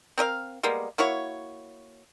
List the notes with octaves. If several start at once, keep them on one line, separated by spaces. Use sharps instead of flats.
C4 A#4 D#5 F5
G3 G#3 A#3 B3
A#3 E4 F#4 C#5